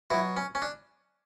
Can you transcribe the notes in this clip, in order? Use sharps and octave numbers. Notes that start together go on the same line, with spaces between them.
B2 F#3 E4
C#4
C#4
D4